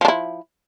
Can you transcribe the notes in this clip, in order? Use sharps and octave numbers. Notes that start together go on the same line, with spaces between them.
F3 D4 E4